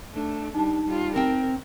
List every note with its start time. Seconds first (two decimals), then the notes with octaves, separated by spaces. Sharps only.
0.13 A3 D4
0.55 G3 D4 D#4 A5
0.86 G3 F4
1.16 C4 A#4 G5